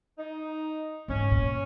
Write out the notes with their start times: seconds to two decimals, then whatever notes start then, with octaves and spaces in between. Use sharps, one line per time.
0.18 D#4
1.08 G#2 C#4
1.31 A#2